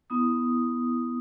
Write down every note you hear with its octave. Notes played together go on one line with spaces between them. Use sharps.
B3 E4 D#6